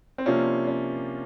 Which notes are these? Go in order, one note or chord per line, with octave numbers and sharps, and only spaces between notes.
C4
C3 F3 A#3 C#4 D4 F4
C#4